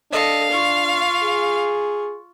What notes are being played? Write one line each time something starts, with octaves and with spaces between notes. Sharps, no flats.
D4 A4 D#5 F5
F4 C#6
G#4